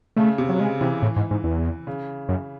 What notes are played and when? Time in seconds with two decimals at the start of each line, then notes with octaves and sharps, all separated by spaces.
0.17 C#3 A3
0.38 C3
0.49 F#3
0.59 C#3 G#3
0.81 C3 E3
1.02 A2
1.16 G#2
1.31 G#2
1.44 E2
1.87 C#3
2.29 F#2